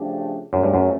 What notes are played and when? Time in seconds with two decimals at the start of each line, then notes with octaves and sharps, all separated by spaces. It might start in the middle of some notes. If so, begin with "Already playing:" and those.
Already playing: C#3 F3 A3 D4 G4
0.53 F#2 C#3 F#3 A3 C#4
0.63 G2
0.74 F#2